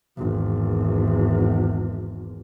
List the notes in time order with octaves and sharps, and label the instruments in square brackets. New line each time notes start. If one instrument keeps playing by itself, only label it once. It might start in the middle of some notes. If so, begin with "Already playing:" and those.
[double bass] G#1 E2